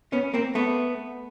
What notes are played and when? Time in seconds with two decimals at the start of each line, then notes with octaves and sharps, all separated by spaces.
0.12 B3 C#4
0.34 A#3 C4
0.55 A3 B3